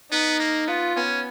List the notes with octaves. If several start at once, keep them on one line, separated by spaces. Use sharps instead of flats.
B3 D#4
A#3
B3 F4
B3 C#4